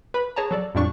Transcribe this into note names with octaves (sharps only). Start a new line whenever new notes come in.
B4 B5
G#4 C#5 A5 A#5
F#3 A4 D5
F2 A2 G3 D4 C#6